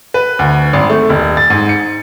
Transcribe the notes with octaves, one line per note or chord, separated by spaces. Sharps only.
B4
D2
G#1
A3
D#1
A6
G#2
C#7